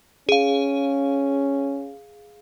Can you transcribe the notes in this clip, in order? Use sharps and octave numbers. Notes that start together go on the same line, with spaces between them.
C#4 G#4 F5